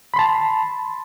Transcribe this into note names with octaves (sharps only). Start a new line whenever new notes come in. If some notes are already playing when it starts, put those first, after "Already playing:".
A5 B5 C6